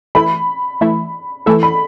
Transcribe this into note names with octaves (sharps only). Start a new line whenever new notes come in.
E3 A3 E4 B5
E3 A3 E4
E3 A3 E4 A4
B5